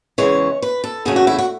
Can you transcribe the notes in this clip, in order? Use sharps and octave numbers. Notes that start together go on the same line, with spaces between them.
E2 C#3 E3 G#3 C#5
B4
A4
E2 C#3 F#3 A3 G#4
F#4
E4
F#4